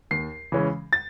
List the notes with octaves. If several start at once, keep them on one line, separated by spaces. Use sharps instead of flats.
D#2 C7
C#3 E3 G#3 C#4
A6